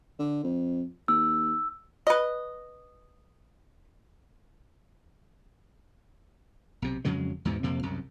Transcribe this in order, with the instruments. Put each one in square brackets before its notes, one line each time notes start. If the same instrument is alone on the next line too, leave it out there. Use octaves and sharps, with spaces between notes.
[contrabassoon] D3
F2
[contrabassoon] D#2 [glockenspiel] E6
[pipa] B4 D#5
[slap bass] B1 C3
F2 C#3 F#3 G#3
E2 G#2 B2
F2 C3 A#3
C2 F#2